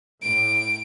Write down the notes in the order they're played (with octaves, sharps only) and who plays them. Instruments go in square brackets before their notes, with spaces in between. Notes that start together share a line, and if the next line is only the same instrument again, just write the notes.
[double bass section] A2 [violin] D7